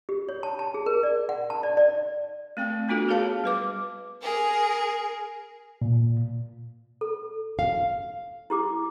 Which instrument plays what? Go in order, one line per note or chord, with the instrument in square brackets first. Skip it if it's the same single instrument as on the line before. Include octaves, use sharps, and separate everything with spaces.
[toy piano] G4
C#5
A5
A5
G#4
A#4
D5
F#5
A5
D5
D5
[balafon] A3 C4 G5
A3 B3 D4 F4 F#4 A4
G#4 A#4 C#5 F5 A5
G3 B4 D6
[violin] G#4 A#4
[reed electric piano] A#2
[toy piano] A4
[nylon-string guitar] F5
[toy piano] E4 G4 D6